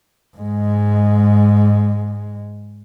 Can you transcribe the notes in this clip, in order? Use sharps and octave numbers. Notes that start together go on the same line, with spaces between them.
G#2 G#3